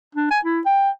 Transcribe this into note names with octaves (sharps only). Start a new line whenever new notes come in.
D4
G#5
E4
G5